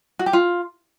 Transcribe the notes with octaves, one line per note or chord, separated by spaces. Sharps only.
F#4
G4
F4